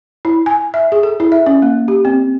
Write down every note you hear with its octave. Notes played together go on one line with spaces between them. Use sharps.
E4
G#5
E5
G#4
A4
E4
E5
C#4
A#3
G4
C4